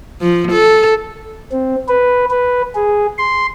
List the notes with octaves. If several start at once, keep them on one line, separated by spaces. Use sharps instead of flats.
F3
A4
C4
B4
B4
G#4
C6